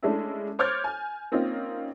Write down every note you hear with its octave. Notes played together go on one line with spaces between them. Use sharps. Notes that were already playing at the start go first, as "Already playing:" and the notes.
G#3 A3 C#4 D4 E4
C5 C#5 D6 F6 G6 A6
G#5
A#3 C4 C#4 D#4 F4